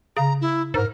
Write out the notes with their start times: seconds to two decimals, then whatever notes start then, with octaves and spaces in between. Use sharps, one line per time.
0.17 C#3 A#5
0.41 E4
0.74 G#2 A#4